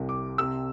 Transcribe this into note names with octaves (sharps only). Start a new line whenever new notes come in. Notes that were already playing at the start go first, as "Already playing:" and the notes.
Already playing: C2 C3
D6
C3 E6